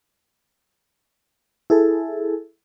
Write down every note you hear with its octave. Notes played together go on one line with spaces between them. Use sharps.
E4 G#4 A4